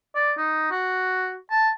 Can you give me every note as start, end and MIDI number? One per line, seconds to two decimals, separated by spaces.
0.15 0.32 74
0.38 0.68 63
0.71 1.34 66
1.51 1.69 81